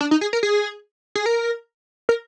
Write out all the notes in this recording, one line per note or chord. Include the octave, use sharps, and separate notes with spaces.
D4
D#4
G#4
A#4
G#4
G#4
A#4
A#4